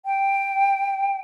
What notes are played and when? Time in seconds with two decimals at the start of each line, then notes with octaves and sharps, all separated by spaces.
0.06 G5